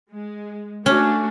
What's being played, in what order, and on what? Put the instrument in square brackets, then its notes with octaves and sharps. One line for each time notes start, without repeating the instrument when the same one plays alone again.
[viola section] G#3
[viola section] A3 D4 F#4 [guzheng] C#4